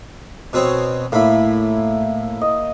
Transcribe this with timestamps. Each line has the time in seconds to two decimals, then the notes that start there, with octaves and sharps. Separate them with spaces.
0.53 B2 C4 C#5
1.12 A2 A#3 E4 B5
2.41 D#5